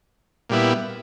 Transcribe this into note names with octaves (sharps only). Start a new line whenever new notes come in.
A#2 G3 B3 E4